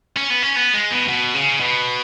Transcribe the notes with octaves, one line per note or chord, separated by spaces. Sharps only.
C#4
B3
C#4
B3
G#3
B2
B2
C#3
B2